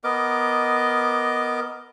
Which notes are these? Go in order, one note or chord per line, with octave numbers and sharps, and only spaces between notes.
B3 A#4 D#5 D6